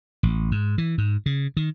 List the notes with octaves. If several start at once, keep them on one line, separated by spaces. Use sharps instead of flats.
A1
G#2
E3
G#2
C#3
D#3